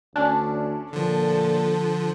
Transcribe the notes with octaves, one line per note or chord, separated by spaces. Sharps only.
D2 C#4 D4
A#2 D3 F3 A4